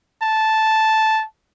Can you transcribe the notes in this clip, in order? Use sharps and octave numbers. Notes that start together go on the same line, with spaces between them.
A5